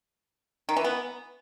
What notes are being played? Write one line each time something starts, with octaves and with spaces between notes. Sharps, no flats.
D#3
E3
B3